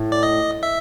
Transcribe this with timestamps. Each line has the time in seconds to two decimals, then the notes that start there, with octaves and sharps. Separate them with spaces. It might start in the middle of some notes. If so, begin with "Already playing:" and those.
Already playing: A2
0.12 D5
0.23 D#5
0.63 E5